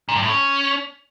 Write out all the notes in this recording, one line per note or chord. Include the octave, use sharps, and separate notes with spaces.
A#2
G2
A2
C#4